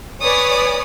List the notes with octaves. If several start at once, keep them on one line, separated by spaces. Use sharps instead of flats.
B4 C#5 D5 G#5 D#6